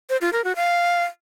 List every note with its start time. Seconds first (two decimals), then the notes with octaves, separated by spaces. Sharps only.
0.10 C5
0.21 F4
0.33 A#4
0.44 F#4
0.56 F5